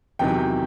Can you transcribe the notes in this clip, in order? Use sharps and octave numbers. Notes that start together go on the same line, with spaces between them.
E2 C3 D#3 F#3 G5